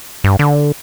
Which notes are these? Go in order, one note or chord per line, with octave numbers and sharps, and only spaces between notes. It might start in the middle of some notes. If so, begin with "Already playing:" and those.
G2
D3